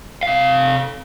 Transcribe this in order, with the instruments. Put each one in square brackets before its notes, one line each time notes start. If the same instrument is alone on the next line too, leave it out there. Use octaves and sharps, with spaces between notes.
[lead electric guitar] C3 F5